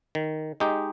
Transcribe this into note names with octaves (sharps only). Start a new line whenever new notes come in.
D#3
G#3 D#4 G4